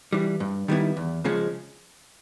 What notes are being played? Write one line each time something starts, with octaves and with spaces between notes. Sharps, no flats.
E3 G3
G2
D#3 G3 B3 E4
E2
C#3 F3 G#3 C#4